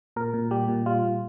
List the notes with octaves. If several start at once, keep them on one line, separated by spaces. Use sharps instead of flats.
A#2 A#4
A#2
G3 G4
A#2
G3 F4
A#2